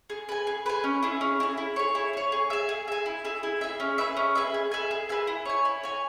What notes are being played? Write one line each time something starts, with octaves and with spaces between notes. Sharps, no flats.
G#4
B4 G#5
G#4
B4 G#5
C#4
E4 G#4
C#4
E4 G#4
E4
G#4 C#5
E4
G#4 C#5
G#4
E5 G#5
G#4
E5 G#5
E4
G#4 E5
E4
G#4 E5
C#4
G#4 B4 E5
C#4
G#4 B4 E5
G#4
B4 E5 G#5
G#4
B4 E5 G#5
E4
C#5 G#5
E4
C#5 G#5